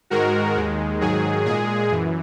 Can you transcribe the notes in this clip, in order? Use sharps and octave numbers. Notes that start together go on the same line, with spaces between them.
G#2 D#3 G#3 F#4 A#4
D#2 D#3 G#3
G#2 D#3 F#3 G#4
A#2 G#3 G#4
F#2 E3